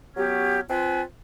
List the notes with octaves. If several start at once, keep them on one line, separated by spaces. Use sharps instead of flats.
F#3 B3 C#4 G4
C4 F4 B4 G#5